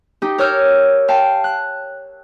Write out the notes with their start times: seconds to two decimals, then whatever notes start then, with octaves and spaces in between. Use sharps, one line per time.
0.22 D#4 G4
0.38 A#4 C#5 E6 F6 G6
1.08 F5 G5 A5
1.44 F#6